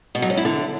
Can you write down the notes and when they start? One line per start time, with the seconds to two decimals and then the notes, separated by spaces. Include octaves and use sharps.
0.15 B2
0.22 F#3
0.30 C#4
0.37 E4
0.45 D3